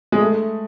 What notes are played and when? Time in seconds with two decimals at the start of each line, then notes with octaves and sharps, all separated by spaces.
0.12 G#3
0.20 A3